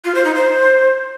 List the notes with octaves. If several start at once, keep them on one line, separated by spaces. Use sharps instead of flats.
F4
C5
D#4
C5